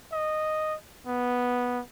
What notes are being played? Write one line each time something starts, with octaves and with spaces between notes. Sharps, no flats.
D#5
B3